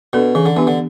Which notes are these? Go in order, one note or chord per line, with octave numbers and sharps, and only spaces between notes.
B2 D4 A4 D5
C#3 E3
D3
E3 B3 D4 G4
D3